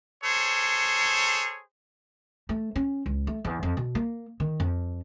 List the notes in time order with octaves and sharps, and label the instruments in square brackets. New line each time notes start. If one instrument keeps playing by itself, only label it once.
[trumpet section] G#4 A4 C5 C#5
[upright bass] A3
C#4
C#2
A3
E2
F2
B2
A#3
D#3
F2